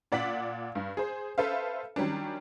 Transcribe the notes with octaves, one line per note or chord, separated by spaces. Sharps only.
A#2 D5 F#5 B6 F#7
G2
G#4 C5
A4 B4 C5 E5 F5
D#3 F#3 G3 C#4 D4